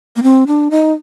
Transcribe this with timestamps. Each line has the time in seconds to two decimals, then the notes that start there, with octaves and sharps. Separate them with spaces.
0.16 A#3
0.23 C4
0.47 D4
0.71 D#4